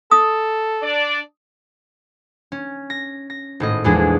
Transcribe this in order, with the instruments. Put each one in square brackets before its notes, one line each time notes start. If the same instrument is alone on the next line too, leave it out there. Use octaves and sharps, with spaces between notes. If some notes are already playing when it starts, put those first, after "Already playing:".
[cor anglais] A4 [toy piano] D#6
[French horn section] D4 D5
[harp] C#4
A#6
A#6
G#1 A2 D#5
A#1 E2 G#3 D4 G#4